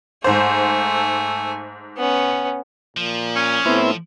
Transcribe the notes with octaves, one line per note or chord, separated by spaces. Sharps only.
G#2 A3 C5 G#5
B3 C#4
A#2 F3
C#4
A2 B3 C4 E4